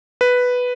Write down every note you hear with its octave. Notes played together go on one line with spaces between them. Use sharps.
B4